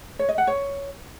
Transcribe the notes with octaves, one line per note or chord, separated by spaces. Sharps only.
C#5
D#5
F#5
C#5